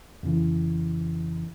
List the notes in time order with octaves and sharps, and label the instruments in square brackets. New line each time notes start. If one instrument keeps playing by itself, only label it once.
[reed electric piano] F2 C#3 E3